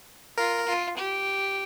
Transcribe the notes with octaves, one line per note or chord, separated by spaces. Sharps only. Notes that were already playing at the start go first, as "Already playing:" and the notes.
F4 A#4
F4
G4